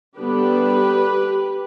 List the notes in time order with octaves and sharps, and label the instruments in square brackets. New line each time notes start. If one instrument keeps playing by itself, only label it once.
[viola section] D3 G3 B3 D4 G4 B4